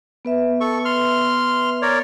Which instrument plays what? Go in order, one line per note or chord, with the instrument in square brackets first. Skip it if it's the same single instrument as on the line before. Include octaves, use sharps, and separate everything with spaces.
[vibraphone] B3 B4 E5
[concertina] A4 C#6
C6 F6
A#4 C#5 D5